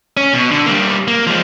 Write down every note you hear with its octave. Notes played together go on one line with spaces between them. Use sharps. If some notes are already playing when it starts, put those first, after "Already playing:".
C#4
B2
D3
G3 A#3
A#3
F3 G#3